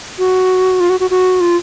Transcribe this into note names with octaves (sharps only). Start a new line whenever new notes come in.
F#4
F4
F#4
F#4
F#4
F4